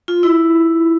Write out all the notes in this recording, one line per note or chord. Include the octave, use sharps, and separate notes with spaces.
F4
E4